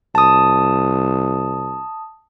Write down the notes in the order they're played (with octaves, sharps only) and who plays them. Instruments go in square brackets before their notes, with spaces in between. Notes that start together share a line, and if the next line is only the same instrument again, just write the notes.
[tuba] C2 [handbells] A5 D#6